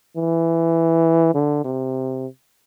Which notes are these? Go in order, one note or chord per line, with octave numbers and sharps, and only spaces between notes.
E3
D3
C3